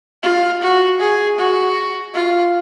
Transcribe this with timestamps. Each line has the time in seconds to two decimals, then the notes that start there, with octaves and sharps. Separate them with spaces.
0.23 F4
0.62 F#4
1.00 G#4
1.38 F#4
2.14 F4